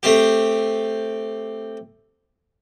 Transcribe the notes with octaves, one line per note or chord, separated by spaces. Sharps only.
A3 C4 G4